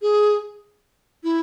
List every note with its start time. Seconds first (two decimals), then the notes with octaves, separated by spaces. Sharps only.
0.02 G#4
1.24 E4